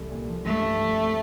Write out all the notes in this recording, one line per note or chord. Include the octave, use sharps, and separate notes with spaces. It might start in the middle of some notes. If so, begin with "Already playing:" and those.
Already playing: C2 A3
A#2
F3
G2 A3
G2
F3
C4